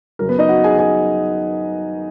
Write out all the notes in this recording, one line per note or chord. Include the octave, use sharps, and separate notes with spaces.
F#2 C#3 F#3 A#4
B3 B4
D#4 D#5
F#4 F#5
G#4 G#5
G#4 G#5